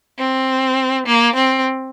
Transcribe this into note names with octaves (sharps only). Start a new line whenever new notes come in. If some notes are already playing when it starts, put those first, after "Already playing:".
C4
A#3
C4